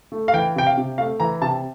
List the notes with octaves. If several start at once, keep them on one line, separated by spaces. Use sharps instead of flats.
A3
F5
E3 G5
C3 G5
F5
C3
A3 F5
E3 A#5
C3 A5